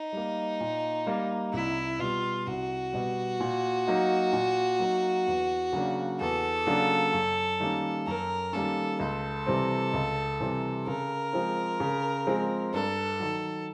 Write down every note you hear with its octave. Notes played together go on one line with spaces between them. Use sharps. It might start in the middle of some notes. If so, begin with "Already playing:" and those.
Already playing: D#4
G3 A#3
A#2
G3 A#3
C2 E4
B2 G3 F4
C2 F#4
B2 G3
A#2
F#3 A#3 D#4
A#2
F#3 A#3 D#4
E2
C#3 F#3 A#3 D4
E2 A4
C#3 F#3 A#3 D4
F#2
D#3 G3 A#3 C#4
F#2 A#4
D#3 G3 A#3 C#4 A4
C#2 A4
C3 E3 G3 C4
C#2
C3 E3 G3 C4
C#3 A#4
F3 G#3 C4
C#3
F3 G#3 C4
G2 A4
D#3 F#3